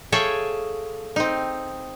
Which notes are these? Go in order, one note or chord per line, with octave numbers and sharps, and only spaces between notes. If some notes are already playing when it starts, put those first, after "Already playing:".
G#4 A4 C#5 E5 F5 G5
C4 D#4